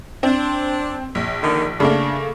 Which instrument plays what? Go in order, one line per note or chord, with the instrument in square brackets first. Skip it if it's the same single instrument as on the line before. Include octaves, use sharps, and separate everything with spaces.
[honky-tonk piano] C4 [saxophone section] D4
[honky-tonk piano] A#1
[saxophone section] D3 D#3
[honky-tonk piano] C#3 A3 A#3 [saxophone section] D4